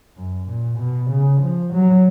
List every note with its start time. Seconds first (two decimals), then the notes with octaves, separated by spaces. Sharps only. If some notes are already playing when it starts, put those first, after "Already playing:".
0.16 F#2
0.48 A#2
0.79 B2
1.10 C#3
1.42 F3
1.73 F#3